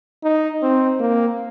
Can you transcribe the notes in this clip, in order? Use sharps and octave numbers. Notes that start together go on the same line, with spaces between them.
D#4
C4
A#3